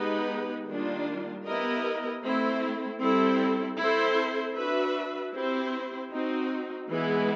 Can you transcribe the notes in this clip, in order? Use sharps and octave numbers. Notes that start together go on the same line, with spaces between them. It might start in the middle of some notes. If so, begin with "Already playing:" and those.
Already playing: G#3 B3 D#4 G4 B4
D#3 G3 A#3 D4 F4
B3 E4 G4 A#4 D#5
A3 C4 E4
G3 C4 E4 A4
C4 E4 A4 C5
D4 F#4 B4 E5
C4 E4 G4 C5
C4 D#4 F#4
E3 G#3 B3 E4